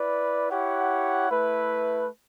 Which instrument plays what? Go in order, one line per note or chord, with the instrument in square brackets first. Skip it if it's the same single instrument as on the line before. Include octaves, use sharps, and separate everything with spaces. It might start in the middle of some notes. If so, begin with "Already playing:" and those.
Already playing: [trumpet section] E4 B4 D5
E4 G4 C#5 F#5
A3 E4 B4